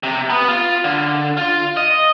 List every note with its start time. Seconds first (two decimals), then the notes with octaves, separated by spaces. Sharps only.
0.03 C3
0.30 B3
0.48 F4
0.84 D3
1.37 F4
1.77 D#5